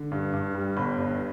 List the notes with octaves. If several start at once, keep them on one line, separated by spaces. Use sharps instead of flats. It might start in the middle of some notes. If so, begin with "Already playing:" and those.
Already playing: D3
G2
G2
G3
G1 B5
G2